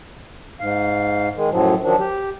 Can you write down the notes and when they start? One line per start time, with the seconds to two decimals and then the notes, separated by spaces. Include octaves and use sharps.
0.60 G#2 F5
1.36 D#3 G#3
1.50 F#2 A2 F3 F#3
1.83 D#3 F3 F#3 D4
1.99 G4